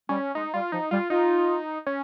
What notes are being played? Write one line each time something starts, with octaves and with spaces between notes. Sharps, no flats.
G3 C#4
G#3 D#4
G3 F4
F3 D#4
G3 F4
D#4 F4
C#4